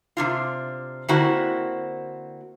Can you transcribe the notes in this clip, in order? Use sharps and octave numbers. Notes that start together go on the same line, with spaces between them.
C3 D4 F4
D3 A#3 C4 E4 F#4